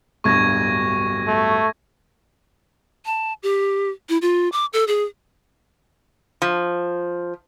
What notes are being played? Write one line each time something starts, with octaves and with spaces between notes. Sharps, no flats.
D1 G2 B2 C#6 G#6 A#6
A3
A5
G4
E4
F4
D6
A4
G#4
F3